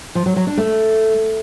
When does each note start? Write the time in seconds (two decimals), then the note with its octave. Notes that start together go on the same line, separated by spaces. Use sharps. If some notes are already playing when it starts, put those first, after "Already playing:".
0.15 F3
0.26 F#3
0.36 F#3
0.47 D4
0.57 A3